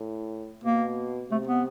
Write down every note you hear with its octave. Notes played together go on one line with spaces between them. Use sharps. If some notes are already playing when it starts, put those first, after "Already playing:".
Already playing: A2
B2 A#3
C3 A3
B3